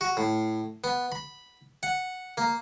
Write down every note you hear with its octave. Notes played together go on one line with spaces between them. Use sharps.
F#4
A2
B3
B5
F#5
A#3